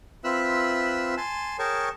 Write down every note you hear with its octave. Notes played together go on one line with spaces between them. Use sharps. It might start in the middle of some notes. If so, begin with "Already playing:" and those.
C4 F4 B4 E5 E6 F#6
G#5 A5 C6
G#4 A#4 C#5 G5 A5 C#6